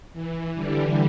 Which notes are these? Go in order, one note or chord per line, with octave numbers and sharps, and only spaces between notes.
E3
D3 G3